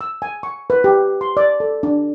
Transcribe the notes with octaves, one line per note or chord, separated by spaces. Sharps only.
E6
G#5
C#6
B4
G4
C6
D5
A4
D4